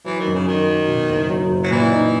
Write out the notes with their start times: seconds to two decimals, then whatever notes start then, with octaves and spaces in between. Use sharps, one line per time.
0.06 E3 F#3
0.20 D#3
0.27 F#2
0.34 C#3
0.47 D#3 F#3
0.69 F#3
0.88 B2
1.10 F#1
1.30 F#3
1.51 F#1
1.64 F#3
1.71 A#2 E3
1.92 D#4